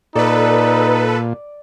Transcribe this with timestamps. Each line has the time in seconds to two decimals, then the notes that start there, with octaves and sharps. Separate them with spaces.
0.15 A#2 D#4 A4 B4 D5